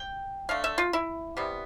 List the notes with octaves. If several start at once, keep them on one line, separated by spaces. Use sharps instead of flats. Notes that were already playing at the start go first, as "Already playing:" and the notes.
Already playing: G5
D3 A3 F5
E5
F4
E4
C3 G3 B3